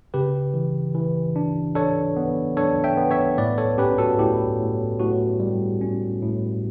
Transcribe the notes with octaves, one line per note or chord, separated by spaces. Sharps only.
C#3 G4 B4
E3
E3
D4
D4 A4 C#5
B3
D4 A4 C#5
E5 G5
B3
C#5 E5
A2 B4 D5
A4 C#5
C#4 G4 B4
F#4 A4
A2 E4 G4
A2
A2 F#4
G3
C#4
A2